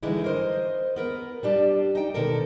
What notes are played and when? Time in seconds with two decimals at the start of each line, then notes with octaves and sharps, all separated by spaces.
0.03 D3 E3 G3 G#3 D#4 E4
0.24 A#4 C5 D#5
0.96 B3 A#4 B4
1.43 G3 D4 G4 A5
1.95 D#4 G5
2.14 B2 D3 D#3 A4 A#4